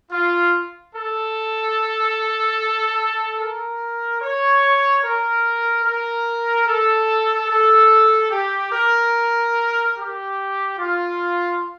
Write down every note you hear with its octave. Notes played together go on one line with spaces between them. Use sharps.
F4
A4
A#4
C#5
A#4
A#4
A4
A4
G4
A#4
G4
F4